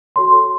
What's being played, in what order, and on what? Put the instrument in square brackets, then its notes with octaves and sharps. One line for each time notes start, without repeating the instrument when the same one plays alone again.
[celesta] F#4 A4 C#5 C6